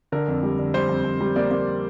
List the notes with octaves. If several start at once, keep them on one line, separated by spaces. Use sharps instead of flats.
D3 A#4
F2
G3
D3
G3 C5
F2
F2
G3
A#3 D5
A#3